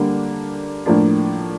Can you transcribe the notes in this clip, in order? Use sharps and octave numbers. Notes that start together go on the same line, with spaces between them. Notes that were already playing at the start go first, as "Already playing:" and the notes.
Already playing: D3 G3 A#3 D4
A2 F3 A#3 D4